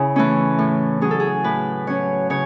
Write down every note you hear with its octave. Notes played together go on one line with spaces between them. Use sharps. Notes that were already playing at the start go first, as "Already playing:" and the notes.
Already playing: C#3 E4
E3 A3 C#4
A2
F#3 C#4 G#4
A4
G#4
A2 B4
F#3 C#4 C#5
C#3 C#5